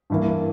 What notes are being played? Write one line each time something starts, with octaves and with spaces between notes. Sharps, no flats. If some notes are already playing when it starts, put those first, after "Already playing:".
G2 E3 A#3